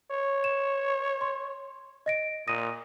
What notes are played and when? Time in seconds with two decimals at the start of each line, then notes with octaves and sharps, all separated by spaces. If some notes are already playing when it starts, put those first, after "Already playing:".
0.11 C#5
0.44 E7
1.21 C6
2.06 D#5 A#6 D7
2.47 A#2 D#6 A#6 D#7